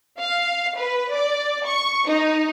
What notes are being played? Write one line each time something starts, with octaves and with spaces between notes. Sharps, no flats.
F5
B4
D5
C#6
D#4